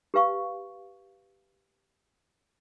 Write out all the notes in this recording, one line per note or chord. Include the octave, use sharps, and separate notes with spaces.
G4 B4 F5 C#6